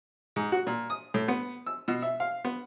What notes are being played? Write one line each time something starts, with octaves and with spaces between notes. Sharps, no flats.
G#2
F#4
A#2
D#6
A2
B3
E6
B2
E5
F5
B3